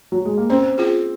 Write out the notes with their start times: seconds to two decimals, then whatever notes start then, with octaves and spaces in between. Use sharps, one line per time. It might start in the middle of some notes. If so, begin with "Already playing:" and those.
0.12 F#3
0.25 G#3
0.37 A#3
0.50 C4 C#4
0.78 F4 G#4